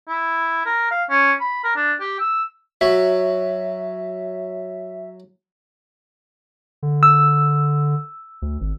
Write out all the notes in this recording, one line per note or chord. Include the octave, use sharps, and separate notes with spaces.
E4
A#4
F5
C#4
B5
A#4
D4
G4
E6
F#3 E5
D3
E6
D2
G#1